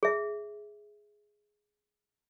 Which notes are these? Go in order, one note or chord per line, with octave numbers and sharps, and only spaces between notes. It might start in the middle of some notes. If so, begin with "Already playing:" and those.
G#4 E5